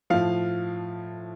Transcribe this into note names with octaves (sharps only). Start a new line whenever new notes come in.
A2 F3 F5